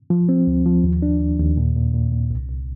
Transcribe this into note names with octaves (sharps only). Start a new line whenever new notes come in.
F3
C4
D2
F3
D#2
D4
D#2
D#2
A#2
A#2
A#2
A#2
C2
C2